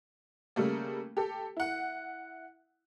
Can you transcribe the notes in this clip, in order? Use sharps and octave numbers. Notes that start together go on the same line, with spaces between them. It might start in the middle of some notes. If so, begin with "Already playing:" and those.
C#3 G3 A3 A#3
G4 A4
E4 F#5